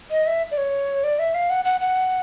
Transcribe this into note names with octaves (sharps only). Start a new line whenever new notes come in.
D#5
E5
D5
C#5
D5
E5
F5
F#5
F#5
F#5